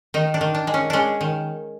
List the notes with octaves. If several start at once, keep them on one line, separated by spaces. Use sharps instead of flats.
D#3 D#4
D4
D#3
D4
G#3
C#4
G#3 C#4 D4
D#3